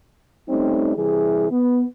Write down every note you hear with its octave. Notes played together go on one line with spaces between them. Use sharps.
G3 A3 C4 C#4 D#4
C3 E3 G3 E4 G#4
B3